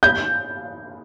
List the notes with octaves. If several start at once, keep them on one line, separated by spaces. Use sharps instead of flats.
G6